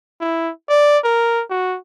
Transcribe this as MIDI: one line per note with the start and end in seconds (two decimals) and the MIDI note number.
0.21 0.51 64
0.70 0.98 74
1.04 1.43 70
1.50 1.77 66